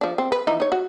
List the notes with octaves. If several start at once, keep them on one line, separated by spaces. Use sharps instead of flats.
F3 D4
C4
B4
E3 F3 D#4
D#4 C#5
F#4